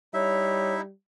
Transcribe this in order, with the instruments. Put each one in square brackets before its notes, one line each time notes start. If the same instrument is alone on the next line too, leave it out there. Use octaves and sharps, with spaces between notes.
[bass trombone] G3 [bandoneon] D#4 E4 [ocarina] C#5 [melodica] E5